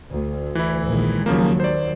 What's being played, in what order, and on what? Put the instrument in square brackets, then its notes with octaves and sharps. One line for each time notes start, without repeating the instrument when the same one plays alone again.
[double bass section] D2
[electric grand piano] E3 E4
[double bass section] A#1 D#3 G#3
[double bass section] D#2 F#3 [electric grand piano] C#3 F3 A#3
[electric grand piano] C5 D5